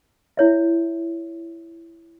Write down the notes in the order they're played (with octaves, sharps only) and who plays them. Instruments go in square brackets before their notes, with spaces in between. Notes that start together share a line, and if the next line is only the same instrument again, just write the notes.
[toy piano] E4 C#5 E5